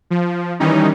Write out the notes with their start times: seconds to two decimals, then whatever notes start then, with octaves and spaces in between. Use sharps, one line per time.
0.10 F3
0.60 D#3 E3 G3 C#4 D#4